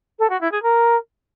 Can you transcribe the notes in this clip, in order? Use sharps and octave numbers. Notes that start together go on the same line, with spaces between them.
A4
F#4
E4
G#4
A#4